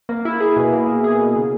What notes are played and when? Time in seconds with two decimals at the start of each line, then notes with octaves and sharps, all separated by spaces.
0.09 A#3
0.25 E4
0.40 G#4
0.56 B2
0.72 A#3
0.88 E4
1.04 G#4
1.20 B2
1.36 C#3